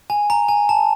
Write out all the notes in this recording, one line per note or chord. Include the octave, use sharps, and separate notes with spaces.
G#5
A#5
G#5
A5